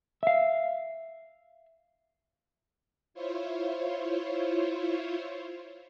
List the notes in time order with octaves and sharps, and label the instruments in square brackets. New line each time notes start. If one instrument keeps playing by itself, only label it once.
[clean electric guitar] E5 F5
[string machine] E4 F4 C5 C#5